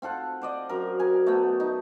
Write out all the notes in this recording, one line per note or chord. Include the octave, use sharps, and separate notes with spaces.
C4 F4 A4 F#5
C5 D5 D#5
F#2 A#4
A#4 G#5
A3 B3
D#4